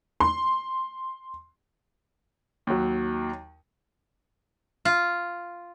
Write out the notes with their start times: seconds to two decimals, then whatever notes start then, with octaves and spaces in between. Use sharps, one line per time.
0.20 C6
2.67 D#2 F#3
4.85 F4